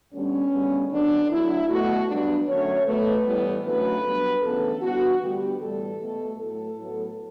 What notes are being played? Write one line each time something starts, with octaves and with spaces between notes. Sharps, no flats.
D2 D3 G3 B3 C#4
D2 C#3 G3 B3
F#2 D3 F#3 B3 D4
D2 D3 F#3 E4
B2 A3 F#4
G2 F#3 B3 D4
F#2 D3 F#3 A3 C#5
B2 A3 B4
A2 E3 G3 B3
D2 C#3 F#3 A3 B4
G2 F#3 B3
D2 C#3 E3 B3 A4
G2 E3 B3 F#4
D2 D3 G3 B3 G4
A2 E3 G3 B3 A4
B2 A3
A2 F#3 A3 A4
A2 F#3 B3